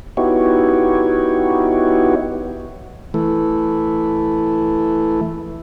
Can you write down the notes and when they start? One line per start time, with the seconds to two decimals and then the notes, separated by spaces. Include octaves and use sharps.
0.17 B3 D#4 E4 F#4 G4 C#5
3.14 E3 A3